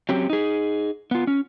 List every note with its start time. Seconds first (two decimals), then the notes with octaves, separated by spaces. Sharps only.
0.09 F#3 C4 C#4 G4
0.30 D#4 G#4
1.11 B3 F4
1.27 C#4